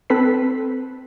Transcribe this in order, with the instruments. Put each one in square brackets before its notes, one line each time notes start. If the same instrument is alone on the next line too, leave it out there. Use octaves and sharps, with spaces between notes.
[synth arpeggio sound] C4 A4 B4 B6